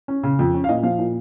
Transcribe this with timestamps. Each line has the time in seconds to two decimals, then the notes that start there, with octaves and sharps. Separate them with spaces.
0.08 C#4
0.23 C#3
0.39 F2
0.54 C#4
0.64 F5
0.69 A#2 D#5
0.83 F3 F5
0.98 A#2